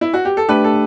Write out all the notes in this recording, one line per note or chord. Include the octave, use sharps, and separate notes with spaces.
E4
F#4
G4
A4
A3 D4 G4 B4
A4